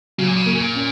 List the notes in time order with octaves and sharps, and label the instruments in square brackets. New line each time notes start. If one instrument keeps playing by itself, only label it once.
[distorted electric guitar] C#3 [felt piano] F#3
[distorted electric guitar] A#2
C#3
[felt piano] A#3
[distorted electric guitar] C#3
A#2
[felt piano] C#4